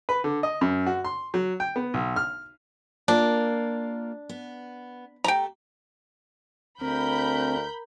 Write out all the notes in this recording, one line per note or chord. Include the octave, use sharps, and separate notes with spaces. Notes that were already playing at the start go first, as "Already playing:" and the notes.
B4
D3
D#5
F#2
F#4
C6
F#3
G5
B3
B1
F6
A#3 D4 F4 A#4
B3
A3 G4 G5 A#5
D2 C4 A#4 B5 G6